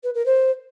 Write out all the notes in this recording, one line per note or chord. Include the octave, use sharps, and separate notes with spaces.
B4
A#4
C5